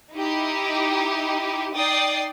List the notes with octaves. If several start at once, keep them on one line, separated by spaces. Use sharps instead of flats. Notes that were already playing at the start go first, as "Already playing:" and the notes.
D#4 E4 G4
D#4 D5 G5 D#6 A6 C7